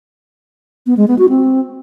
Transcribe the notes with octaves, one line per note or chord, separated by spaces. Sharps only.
B3
G#3
B3
F#4
C4